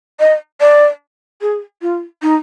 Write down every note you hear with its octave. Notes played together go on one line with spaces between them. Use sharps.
D#5
D5
G#4
F4
D#4